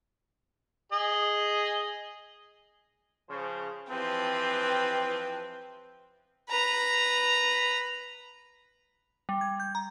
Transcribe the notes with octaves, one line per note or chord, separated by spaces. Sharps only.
G#4 D#5
C#3 F3 C5
E3 F3 C4 G4 B4 G5
B4 A#5
G3
G#6
G6
A#5